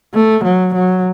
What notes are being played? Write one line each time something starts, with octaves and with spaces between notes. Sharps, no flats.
A3
F#3
F#3